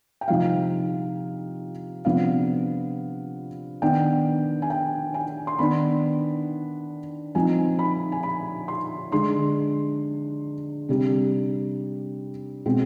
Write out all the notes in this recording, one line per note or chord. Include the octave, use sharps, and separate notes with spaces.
G5
C3 F3 C4 D#4 F5
C3 F3 B3 D4 F5
D#3 B3 D4 G5
G#5
G5
G#5
C6
D#3 B3 D4 B5
F3 C4 D#4 G#5
B5
G#5
B5
C6
D3 G#3 D4 C6
C3 G3 D4
B2 G#3 C4